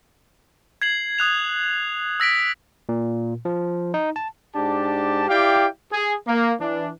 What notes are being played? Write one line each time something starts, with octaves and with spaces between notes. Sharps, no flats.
G#6 C7 F#7
D#6 F#6 F7
E6 A#6 B6 D7
A#2
F3
D#4
A5
G#2 D4 G4 A5
E4 G4 D5 F5 G5
G#4
A#3
E3 D4